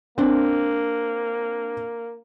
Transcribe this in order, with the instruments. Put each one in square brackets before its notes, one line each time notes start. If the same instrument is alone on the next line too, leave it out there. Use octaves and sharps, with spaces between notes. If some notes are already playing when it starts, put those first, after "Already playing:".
[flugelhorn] A#3 [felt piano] C4 D4